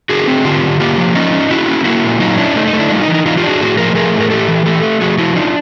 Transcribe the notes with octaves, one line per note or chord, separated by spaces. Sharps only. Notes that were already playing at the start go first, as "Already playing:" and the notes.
D3 F#4 G#4
C4
D3 F4 G4
D3
A#3 F4 G4
F3
C#4 D#4 F4
C#4
C#4 E4 F#4
C#4
A#3 E4 F#4
A#2
F#3 D#4 F4
C#4 D4 E4
A3 D#4
D#4
A3
D4 E4
G3 D#4 F4
D#4
E3
D#4
E3 D#4 F4
F4 G4
D4
F#4 G#4
A2 F#4 G#4
F3 G#4 A#4
A3 G#4 A#4
A2
A#4
A3 G4 A4
E3
A3 G4 A4
A3
F3 F#4 G#4
F3 E4 F#4
D4 D#4 F4